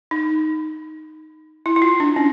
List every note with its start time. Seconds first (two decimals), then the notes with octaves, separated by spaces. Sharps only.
0.11 D#4
1.66 E4
1.76 E4
1.82 F4
2.00 D4
2.16 C#4